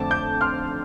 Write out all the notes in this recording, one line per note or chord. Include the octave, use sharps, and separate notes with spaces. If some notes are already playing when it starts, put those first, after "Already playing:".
Already playing: F2 D3 A3 C4 A5 D6
D6 G6
C6 F6